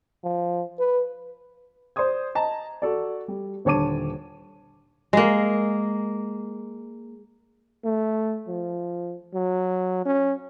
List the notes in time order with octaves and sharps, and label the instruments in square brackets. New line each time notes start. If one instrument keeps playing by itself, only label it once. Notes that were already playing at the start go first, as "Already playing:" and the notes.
[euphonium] F3
B4
[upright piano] C5 D5 C6 D#6 G#6
D#5 A5 A#5
F#4 A4 D5
G3
D#1 D3 C#5 A5 D6 D#7
[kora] G#3 A#3
[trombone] A3
F3
F#3
C#4